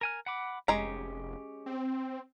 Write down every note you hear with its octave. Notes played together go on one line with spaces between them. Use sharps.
A#4 G#5 F6
F#5 B5 D6
F1 G#3 C#4 G4 A#5
C4